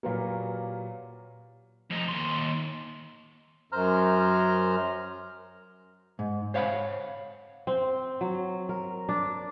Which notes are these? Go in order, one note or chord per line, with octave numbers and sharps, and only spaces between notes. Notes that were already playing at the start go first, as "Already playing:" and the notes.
A#2 F#3 A#3 G4 B4 F5
F2 D#4
D#2 C6
F#2 C5 A#5 F6
G#2
C5 C#5 F5 F#5 B5
C4
F#3
A#4
D4